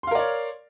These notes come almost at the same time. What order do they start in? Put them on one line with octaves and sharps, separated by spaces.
C6 F5 A#4 D5 C#5